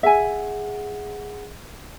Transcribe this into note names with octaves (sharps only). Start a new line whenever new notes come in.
G#4 E5 F#5 G#5